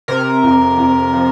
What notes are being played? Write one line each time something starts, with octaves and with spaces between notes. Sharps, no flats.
C3 A#4
F2
F2
F3